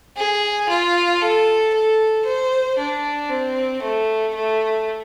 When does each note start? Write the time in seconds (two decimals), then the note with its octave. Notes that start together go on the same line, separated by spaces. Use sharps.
0.16 G#4
0.68 F4
1.21 A4
1.74 A4
2.25 C5
2.78 D4
3.29 C4
3.82 A3
4.34 A3